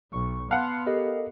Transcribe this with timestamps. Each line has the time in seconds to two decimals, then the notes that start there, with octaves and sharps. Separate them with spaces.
0.12 B1 C#6
0.51 B3 F5 F#5 A5 C6 F#6
0.86 G4 A4 A#4 D#5